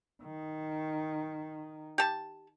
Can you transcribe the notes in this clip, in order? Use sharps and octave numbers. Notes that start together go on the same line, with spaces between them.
D#3
G4 A5